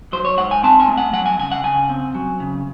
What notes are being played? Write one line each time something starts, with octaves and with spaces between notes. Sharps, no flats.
F#3 C5
C#5
G#2 F#5
G#5
C4 A5
G#5
A3
F#5
F#3 F#5
G#5
C#3 G#5
F#5
C#3 G#5
C4
F#3
C#3